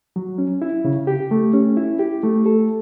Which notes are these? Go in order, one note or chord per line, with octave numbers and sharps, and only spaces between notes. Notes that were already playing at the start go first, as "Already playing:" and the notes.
F#3
C#4
E4
C#3
G4
A3
C#4
E4
G4
A3
A4